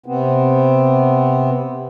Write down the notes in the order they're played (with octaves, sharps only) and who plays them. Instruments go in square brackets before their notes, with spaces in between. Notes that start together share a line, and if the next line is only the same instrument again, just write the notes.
[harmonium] C3 B3 C4